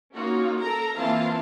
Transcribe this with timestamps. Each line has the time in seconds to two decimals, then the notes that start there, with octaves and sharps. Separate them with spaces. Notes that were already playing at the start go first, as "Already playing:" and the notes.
0.14 A#3 C#4 D#4 F4 F#4
0.60 A4 A#4 A#5
0.97 E3 A#3 C4 F4 F5 A5